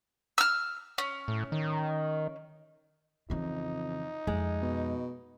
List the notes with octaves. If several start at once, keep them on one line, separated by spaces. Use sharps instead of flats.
E6 F6
C#4
A2
D#3
F2 C#3 E3 D#4
F2 G#3
B2